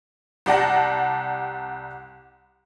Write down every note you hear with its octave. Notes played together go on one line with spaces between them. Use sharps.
C2 G4 D5 F#5 A5 A#6